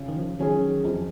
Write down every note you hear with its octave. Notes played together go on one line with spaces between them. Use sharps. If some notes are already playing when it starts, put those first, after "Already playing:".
Already playing: C#3
D#3
F3
D#3 F#3 C#4 G#4
D#3
F2 F3